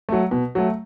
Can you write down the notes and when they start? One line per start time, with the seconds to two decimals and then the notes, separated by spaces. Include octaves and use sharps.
0.09 F#3 A3
0.31 B2
0.55 F#3 A3